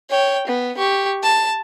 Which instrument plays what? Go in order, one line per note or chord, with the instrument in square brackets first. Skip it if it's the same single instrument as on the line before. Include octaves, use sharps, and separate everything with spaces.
[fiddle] C#5 G5
B3
G4 C#6
A5